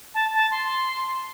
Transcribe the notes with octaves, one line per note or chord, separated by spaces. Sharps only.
A5
A5
C6